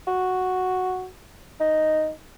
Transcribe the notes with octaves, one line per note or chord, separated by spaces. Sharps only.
F#4
D#4